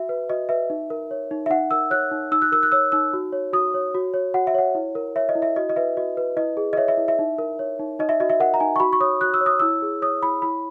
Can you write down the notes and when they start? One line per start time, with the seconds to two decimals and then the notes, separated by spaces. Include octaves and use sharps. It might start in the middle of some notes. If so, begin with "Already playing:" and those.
Already playing: F#4 E5
0.09 B4
0.29 F#4 D#5
0.49 B4 E5
0.70 D#4
0.90 A#4
1.11 C#5
1.31 D#4
1.46 E5
1.50 D#4 F#5
1.71 A#4 E6
1.91 C#5 F#6
2.11 D#4
2.31 D#4 E6
2.42 F#6
2.52 A#4 E6
2.63 F#6
2.72 C#5 E6
2.92 D#4 E6
3.13 F#4
3.33 C#5
3.53 F#4 D#6
3.74 C#5
3.95 F#4
4.14 C#5
4.34 F#4 F#5
4.47 E5
4.54 C#5 F#5
4.75 E4
4.95 A#4
5.16 C#5 E5
5.29 D#5
5.35 E4
5.42 E5
5.56 F#4 D#5
5.69 D#5
5.76 B4 E5
5.97 F#4 D#5
6.17 B4
6.37 E4 D#5
6.57 G#4
6.73 D#5
6.77 C#5 E5
6.88 E5
6.97 E4
7.08 E5
7.19 D#4
7.38 A#4
7.59 C#5
7.79 D#4
7.99 D#4 D#5
8.09 E5
8.20 F#4 D#5
8.30 E5
8.40 A#4 F#5
8.54 A#5
8.60 D#4 G#5
8.76 C#6
8.80 F#4 B5
8.93 C#6
9.00 C#5 D#6
9.21 F#4 F#6
9.34 E6
9.41 C#5
9.46 D#6
9.60 E4 E6
9.82 G#4
10.02 C#5 D#6
10.23 E4 B5
10.42 E4 B5